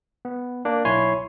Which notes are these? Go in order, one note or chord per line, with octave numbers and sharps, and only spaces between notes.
B3
A#3 D4
B1 E4 C#5 G#5 C6 C7